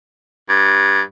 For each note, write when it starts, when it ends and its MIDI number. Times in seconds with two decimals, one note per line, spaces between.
0.49 1.01 43